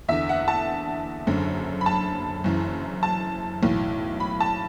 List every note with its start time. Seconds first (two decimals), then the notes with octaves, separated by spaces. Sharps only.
0.09 E2 D3 E5
0.29 F#5
0.48 A5
1.27 F#1 F#2 D3
1.81 B5
1.86 A5
2.44 F#1 F#2 E3
3.03 A5
3.62 B1 A2 E3
4.20 B5
4.40 A5